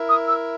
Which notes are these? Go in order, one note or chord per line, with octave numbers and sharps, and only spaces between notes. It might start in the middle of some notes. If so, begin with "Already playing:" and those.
Already playing: E4 A#4 E5
D#6
E6